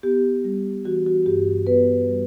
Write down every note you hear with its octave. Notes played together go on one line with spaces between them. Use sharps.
B3 G4
G3
E3 F#4
F#4
G2 G4
B3 B4
G3